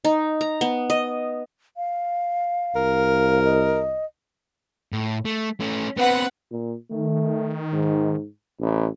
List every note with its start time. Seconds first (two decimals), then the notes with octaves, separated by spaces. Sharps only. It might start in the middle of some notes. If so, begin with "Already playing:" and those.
0.05 D#4
0.41 A#5
0.61 B3
0.90 D#5
1.77 F5
2.76 C2 A#4
3.45 D#5
4.92 A2
5.25 A3
5.60 A3 C#4
5.97 B3 C4 B4 F#5
6.51 A#2
6.91 D#3 A3
7.73 G#2
8.60 A1